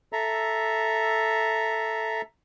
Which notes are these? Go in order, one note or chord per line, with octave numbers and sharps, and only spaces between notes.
A4 E5 A#5